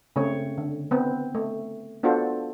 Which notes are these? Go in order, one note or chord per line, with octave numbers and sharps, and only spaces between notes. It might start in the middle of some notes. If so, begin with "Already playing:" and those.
C#3 A3 C4 C#5
D3
B3 C4
A3
B3 D4 F4 F#4 A4 C5